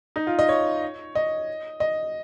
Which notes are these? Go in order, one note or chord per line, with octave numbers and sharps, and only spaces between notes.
D#4
F4
D#5
C#5
D#5
D#5